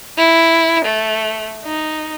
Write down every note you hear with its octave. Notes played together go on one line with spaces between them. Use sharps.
E4
A3
D#4